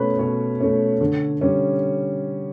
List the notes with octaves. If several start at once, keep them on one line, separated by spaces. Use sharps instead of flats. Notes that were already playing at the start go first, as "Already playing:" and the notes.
Already playing: B2 A3 C#4 B4
B2 C#5
A3 C#4
D3
G3 C#4